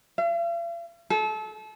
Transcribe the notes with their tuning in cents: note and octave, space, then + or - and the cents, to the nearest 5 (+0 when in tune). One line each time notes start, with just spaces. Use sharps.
F5 -45
A4 -30